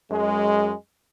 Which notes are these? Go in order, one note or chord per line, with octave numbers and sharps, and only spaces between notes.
F#2 G#3